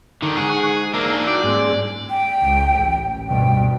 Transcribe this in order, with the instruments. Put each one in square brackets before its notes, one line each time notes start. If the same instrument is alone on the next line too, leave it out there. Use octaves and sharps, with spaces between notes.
[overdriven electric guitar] D3 D#3
[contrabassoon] G#2 [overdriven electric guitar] G#4 [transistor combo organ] F#5 C#6
[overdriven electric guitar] A#3 D4 [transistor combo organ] A#4 E5
[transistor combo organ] E4 F#4 G5 [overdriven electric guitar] D5
[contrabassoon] D#1 [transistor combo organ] G#2
[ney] G5
[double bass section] C#2
A1
[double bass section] D2 G2 B2 [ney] G5